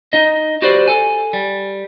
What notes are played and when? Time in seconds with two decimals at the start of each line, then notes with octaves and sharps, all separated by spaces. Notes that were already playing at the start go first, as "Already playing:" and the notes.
0.13 D#4 D#5
0.62 F#4 G4 B4 C5 D5
0.88 A4 G#5
1.33 G3